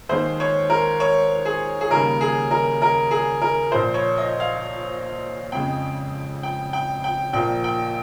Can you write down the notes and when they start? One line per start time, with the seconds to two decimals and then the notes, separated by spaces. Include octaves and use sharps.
0.09 D#2 D#3 G#3 C5
0.40 C#5
0.70 A#4
1.00 C#5
1.45 G#4
1.81 G#4
1.90 D#2 C#3 G3 A#3 A#4
2.21 G#4
2.51 A#4
2.82 A#4
3.11 G#4
3.42 A#4
3.72 A#1 A#2 F3 C5
3.94 C#5
4.18 D#5
4.40 F5
5.52 F2 C#3 G#3 G5
6.43 G5
6.73 G5
7.04 G5
7.33 A#1 A#2 F3 A#3 G5
7.64 G5